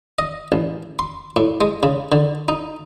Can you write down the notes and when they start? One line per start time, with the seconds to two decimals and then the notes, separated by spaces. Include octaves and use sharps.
0.19 D#5
0.52 A1
0.99 C6
1.36 A2
1.61 G#3
1.83 C#3
2.12 D3
2.48 D#4